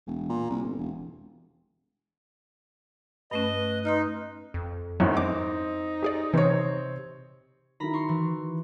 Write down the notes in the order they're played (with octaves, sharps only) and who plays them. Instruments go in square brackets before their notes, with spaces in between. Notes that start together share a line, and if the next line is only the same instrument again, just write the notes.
[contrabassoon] E1
A#2
C2
G1
E1
[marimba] G2 A3 C#4 [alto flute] B4 [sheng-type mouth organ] D#5
[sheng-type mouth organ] D#4 [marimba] C6 D#6 F6
[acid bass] F2
[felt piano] G#1 F#2 [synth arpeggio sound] F#3 E4
[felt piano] C4 [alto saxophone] D#4 [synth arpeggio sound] D6
[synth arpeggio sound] G4 G#4 D5
[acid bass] C3 [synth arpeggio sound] E3 [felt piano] C4 C#5
[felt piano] D#3 F#3 E4 [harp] A#5 B5
[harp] C6 C#6
E3